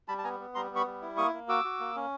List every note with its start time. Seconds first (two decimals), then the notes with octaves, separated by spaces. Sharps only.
0.08 G3 A5 B5
0.18 A5
0.24 B3 G#5 A#5
0.40 B3
0.55 G3 A#5 C6
0.71 B3
0.76 B5 C#6
0.86 G3
1.02 E4
1.17 A#3 C#6 D#6
1.33 A#3
1.48 F#4 D6 E6
1.64 F#4
1.80 A#3
1.96 C#4